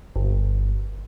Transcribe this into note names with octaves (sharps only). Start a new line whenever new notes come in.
G1